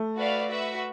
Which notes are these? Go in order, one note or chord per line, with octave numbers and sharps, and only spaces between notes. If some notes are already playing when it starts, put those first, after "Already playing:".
Already playing: A3
F#4 B4 D5 F5
F#4 B4 E5